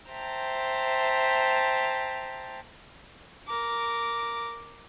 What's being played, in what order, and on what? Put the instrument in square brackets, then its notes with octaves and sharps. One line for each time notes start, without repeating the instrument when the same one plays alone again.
[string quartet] C5 E5 G5 A5 A#5
[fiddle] A#4 D6